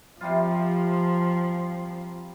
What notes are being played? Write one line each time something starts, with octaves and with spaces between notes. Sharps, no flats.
C3 F3 G3 F4